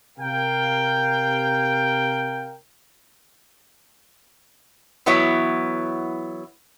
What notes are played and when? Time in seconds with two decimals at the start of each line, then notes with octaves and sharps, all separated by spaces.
0.19 C3 A#4 F5 G5
5.06 E3 F#3 B3 E4 C#5